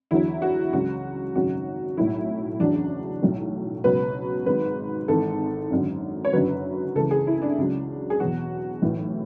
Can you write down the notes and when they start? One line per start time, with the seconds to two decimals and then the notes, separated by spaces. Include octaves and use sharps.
0.11 E2 D3 F#3 E4
0.42 F#4
0.73 C#2 C#3 F#3 F#4
1.35 G#1 F#2 C#3 F#3 F#4
1.97 B1 A2 F#3 E4
2.60 F#1 E2 C#3 F#3 D4
3.22 B1 A2 F#3
3.84 C#2 B2 F#3 B4
4.46 G#1 G#2 F#3 B4
5.08 G#1 G#2 E3 A4
5.71 G#1 F#2 D3
6.25 C#5
6.33 F#1 F#2 D3 F#3 B4
6.95 C#2 C#3 E3 A4
7.11 G#4
7.27 E4
7.42 D4
7.58 C#2 C#3 F#3
8.10 G#4
8.20 E2 B2 F#3 F#4
8.82 B1 A2 E3